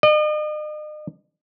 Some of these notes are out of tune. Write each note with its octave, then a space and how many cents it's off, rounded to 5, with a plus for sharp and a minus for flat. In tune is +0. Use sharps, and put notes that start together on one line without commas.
D#5 -40